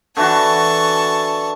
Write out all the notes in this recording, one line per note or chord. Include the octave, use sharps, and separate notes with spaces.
D3 E3 F#4 A5 C#6